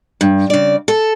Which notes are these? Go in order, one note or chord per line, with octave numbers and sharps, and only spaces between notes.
G2
C#3 D5
A4